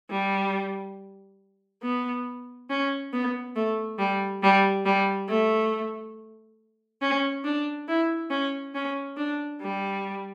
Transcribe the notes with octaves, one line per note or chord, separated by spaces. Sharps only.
G3
B3
C#4
B3
A3
G3
G3
G3
A3
C#4
D4
E4
C#4
C#4
D4
G3